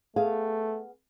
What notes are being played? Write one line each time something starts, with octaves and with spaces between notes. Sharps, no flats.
A3 B3 G#4 F5